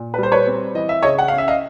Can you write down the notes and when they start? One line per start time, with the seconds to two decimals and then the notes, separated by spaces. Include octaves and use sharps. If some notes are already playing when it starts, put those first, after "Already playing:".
Already playing: A#2
0.14 B4
0.18 G3
0.23 C5
0.32 B4 C#5
0.46 C4
0.75 E3 D#5
0.89 E5
1.02 C#3 C#5 D#5
1.19 F#5
1.28 F5
1.33 C#4
1.38 E5
1.48 D#5 F5